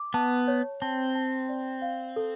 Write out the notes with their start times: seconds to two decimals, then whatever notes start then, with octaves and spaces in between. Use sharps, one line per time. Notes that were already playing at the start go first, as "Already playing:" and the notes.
Already playing: D6
0.14 B3 A5
0.48 C#5
0.82 C4 A5
1.15 A5
1.49 D5
1.82 F5
2.16 A4